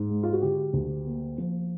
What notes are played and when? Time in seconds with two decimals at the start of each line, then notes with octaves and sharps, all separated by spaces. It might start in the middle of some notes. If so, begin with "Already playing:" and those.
Already playing: G#2
0.10 G#3
0.23 F4
0.33 F#4
0.42 D3 G4
0.73 D2
1.06 A#3
1.38 F3